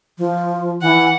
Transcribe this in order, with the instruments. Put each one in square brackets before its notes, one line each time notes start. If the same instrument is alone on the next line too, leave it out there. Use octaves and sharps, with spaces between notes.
[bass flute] F3
[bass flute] E3 [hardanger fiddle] F#5